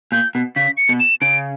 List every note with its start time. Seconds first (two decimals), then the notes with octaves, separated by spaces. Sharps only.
0.12 A#2 G6
0.35 B2
0.56 C#3 B6
0.77 C#7
0.89 B2
1.00 E7
1.21 C#3 D7